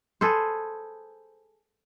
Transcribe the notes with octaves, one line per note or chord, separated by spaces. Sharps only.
G#4 A4 B4 C5